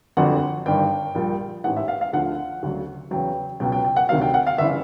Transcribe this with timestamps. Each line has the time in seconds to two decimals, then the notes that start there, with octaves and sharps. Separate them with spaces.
0.17 G1 F2 D3 F#3 F#5
0.66 G1 G2 D#3 G5
1.15 A#1 A#2 G3
1.64 A1 G#2 E3 F#5
1.77 E5
1.88 F5
2.01 F5
2.13 D2 D3 F3 F#5
2.63 D2 C#3 F#3
3.11 E2 C#3 F#3 G5
3.60 C#2 B2 F#3 G5
3.72 G5
3.85 G5
3.96 F#5
4.09 D2 C3 D#3 F#3 F5
4.22 G5
4.34 F#5
4.47 F5
4.58 G1 C#3 E3 E5